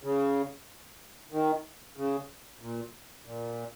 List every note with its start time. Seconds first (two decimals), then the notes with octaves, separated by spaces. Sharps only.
0.03 C#3
1.32 D#3
1.97 C#3
2.61 A#2
3.26 A#2